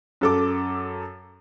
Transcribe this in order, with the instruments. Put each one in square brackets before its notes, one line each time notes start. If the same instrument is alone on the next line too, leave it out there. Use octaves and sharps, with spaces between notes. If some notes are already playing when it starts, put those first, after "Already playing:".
[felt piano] F#2 A4 D6